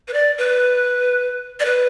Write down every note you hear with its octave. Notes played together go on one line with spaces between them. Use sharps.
B4
D5
B4
D5
B4